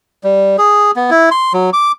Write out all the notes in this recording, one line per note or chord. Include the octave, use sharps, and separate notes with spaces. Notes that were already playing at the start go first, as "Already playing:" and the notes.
G3
G#4
B3
E4
C6
F#3
D6